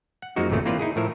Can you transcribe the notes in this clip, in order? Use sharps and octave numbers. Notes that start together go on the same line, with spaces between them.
F#5
F#2 F3 G#3 A#3 D#4 F#4
G#1 F2 A#2 C#3 A3
E3 A#3 C4 F4 B4 D5
D#4 E4 G#4
A2 F3 A#4 E5